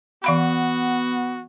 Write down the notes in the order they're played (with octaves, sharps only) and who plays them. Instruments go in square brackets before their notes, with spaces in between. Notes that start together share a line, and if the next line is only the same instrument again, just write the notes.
[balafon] E3 F5 B5 [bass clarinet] B3 [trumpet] F#4